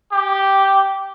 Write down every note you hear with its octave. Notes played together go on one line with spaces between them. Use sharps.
G4